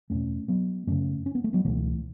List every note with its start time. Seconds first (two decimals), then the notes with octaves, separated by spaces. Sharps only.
0.10 E2 B2 A3 C#4
0.48 F#3 B3
0.87 F#2 C#3 A3 C#4
1.26 C#4
1.35 B3
1.44 A3
1.53 F#3 B3
1.65 C#2 B2 E3 A3